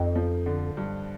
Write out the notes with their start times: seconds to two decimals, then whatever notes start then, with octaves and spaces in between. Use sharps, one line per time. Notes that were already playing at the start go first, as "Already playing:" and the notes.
Already playing: F2 F3 D#4
0.15 F3
0.46 D3
0.77 G2